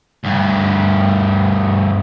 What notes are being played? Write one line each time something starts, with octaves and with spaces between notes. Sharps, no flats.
D2 G2